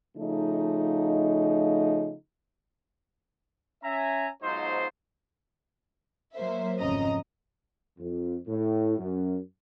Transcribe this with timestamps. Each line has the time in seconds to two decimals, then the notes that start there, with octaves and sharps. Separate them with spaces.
0.17 C#3 F3 A3 D#4
3.84 C#4 E5 G#5 A#5
4.42 B1 G#2 F#3 D#4 F4 C5
6.35 F#3 A#3 C5 E5
6.80 G#1 F2 C#3 D#5 A#5
7.99 F2
8.47 A2
8.98 F#2